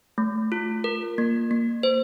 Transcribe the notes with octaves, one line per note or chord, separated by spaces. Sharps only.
A3
F4
A#4
A#3
A#3
C5